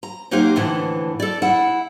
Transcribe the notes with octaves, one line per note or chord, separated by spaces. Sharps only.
A#5
F#3 A#3 D#4 G4 A#4 C5
A2 D3 E3 F3
A4 D5
E4 F#5